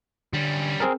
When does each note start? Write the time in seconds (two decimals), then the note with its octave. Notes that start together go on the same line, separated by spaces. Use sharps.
0.33 D3 G3 C#4
0.80 C4 G#4 A#4